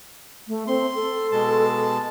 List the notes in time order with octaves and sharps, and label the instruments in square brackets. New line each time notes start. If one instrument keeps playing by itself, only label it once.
[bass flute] A3
[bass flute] C4 [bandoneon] C6
[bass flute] A4
[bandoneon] B2 G#3 A5